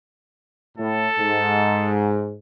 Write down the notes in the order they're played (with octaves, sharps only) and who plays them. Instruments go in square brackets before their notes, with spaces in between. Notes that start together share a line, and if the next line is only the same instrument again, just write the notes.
[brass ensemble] A2 [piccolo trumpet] A4
[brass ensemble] G#2